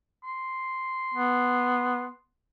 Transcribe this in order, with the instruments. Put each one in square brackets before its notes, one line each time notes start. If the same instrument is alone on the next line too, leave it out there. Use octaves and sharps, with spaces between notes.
[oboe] C6
[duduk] B3